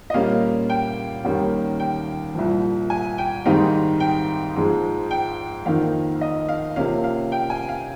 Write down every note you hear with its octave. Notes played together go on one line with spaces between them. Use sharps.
D#5
A#2 G3 A#3 C#4 F4 F5
G5
D#2 D#3 G3 A#3 C#4
G5
C2 A#2 F3
G#5
G5
G#2 D#3 G3 C4 D#4 F5
G5
G#2 F3 G#3
G5
F2 D#3 A#3 D#4 F5
D#5
F5
C3 F3 A#3 C#4 F5
F5
G5
G#5
F5